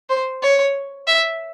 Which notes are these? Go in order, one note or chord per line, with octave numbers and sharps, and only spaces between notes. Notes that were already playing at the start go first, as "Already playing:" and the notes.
C5
C#5
E5